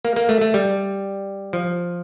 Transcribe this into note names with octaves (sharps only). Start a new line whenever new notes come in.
A#3
A#3
A3
A3
G3
F3